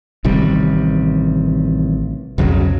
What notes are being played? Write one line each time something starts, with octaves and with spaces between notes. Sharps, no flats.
A1 C3 D#3 G3
B1 F2 C#3 F#3